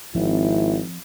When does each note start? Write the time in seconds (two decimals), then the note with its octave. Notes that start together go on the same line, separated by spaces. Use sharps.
0.15 G#1 F3 C4 E4